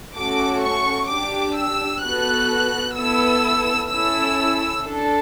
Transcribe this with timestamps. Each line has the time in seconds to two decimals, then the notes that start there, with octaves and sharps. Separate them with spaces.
0.17 A3 C#4 F#4 A4 D6
0.63 C#6
1.10 D4 G4 D6
1.57 E6
2.04 B3 F#4 A4 F#6
2.97 B3 E4 A4 E6
3.91 C#4 E4 A4 E6
4.85 D4 A4